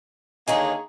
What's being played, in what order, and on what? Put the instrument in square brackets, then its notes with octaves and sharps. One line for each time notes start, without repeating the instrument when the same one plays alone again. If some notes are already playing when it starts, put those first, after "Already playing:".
[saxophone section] D3 A#3 G#4 [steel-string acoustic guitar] D#3 D#4 C#5